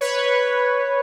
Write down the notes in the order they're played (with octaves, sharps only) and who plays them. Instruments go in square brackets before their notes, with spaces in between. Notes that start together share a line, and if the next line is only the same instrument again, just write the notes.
[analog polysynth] B4 C#5